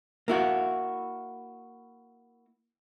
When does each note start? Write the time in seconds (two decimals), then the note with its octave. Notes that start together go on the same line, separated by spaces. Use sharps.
0.28 A#3 E4 F#4